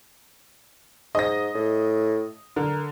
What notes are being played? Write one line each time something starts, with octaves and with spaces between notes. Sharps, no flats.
G#2 D#5 A#6
A2
D3 A#4